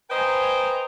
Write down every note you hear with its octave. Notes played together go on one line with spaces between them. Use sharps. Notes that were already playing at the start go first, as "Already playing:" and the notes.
B4 C5 D#5 G5 G#5 A#5